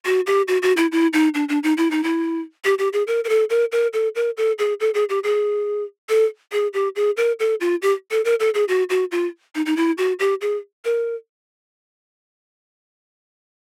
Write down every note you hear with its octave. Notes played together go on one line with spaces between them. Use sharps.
F#4
G4
F#4
F#4
E4
E4
D#4
D4
D4
D#4
E4
D#4
E4
G4
G4
G#4
A#4
A#4
A4
A#4
A#4
A4
A#4
A4
G#4
A4
G#4
G4
G#4
A4
G#4
G4
G#4
A#4
A4
F4
G4
A4
A#4
A4
G#4
F#4
F#4
F4
D#4
D#4
E4
F#4
G4
G#4
A#4